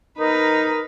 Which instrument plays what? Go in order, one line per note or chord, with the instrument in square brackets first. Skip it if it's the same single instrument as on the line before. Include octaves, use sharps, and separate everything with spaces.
[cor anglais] D#4 [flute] A#4 [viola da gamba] B4